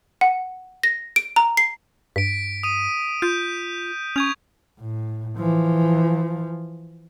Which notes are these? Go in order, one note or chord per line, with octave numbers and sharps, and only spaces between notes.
F#5
A#6
D7
A#5
C7
G2 B6 D7
D#6 D#7
F4 G6
C#4 C#6 G#6 F7
A2
E3 F3